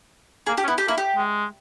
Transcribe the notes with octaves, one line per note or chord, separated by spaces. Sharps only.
A#3 G#4
G4
C#4
B3 E4
G4
A#3 E4
G4
G#3